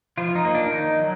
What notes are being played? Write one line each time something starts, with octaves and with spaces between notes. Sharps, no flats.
F3 F4
D#4
A#3
D4
D#3 D#4
F#3